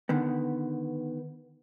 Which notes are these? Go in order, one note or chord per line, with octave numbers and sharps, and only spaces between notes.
D3 D#3 B3